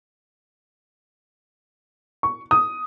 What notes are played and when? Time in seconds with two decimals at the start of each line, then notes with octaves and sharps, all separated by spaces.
2.23 C#6
2.51 D#6